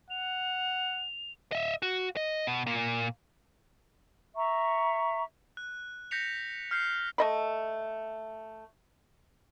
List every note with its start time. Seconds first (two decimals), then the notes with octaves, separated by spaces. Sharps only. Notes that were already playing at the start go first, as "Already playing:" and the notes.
0.10 F#5 F7
1.52 D#5 E5
1.82 F#4
2.17 D#5
2.47 B2
2.67 A#2 A#3
4.35 E5 A#5 C#6
5.57 F#6
6.11 G6 A#6 B6 C#7 F7
6.71 F6 G6 C7
7.18 A3 D#5 B5